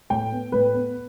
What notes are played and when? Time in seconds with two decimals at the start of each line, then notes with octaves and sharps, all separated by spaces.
0.10 A2 G5
0.32 B3
0.52 A2 B4
0.74 B3